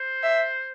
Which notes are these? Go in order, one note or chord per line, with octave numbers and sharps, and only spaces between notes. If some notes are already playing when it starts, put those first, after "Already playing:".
Already playing: C5
E5